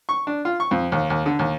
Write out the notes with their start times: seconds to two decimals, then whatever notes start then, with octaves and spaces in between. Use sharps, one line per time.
0.09 C#6
0.27 D4
0.45 F4
0.60 C#6
0.71 F2
0.92 D#2
1.10 D#2
1.26 D3
1.39 D#2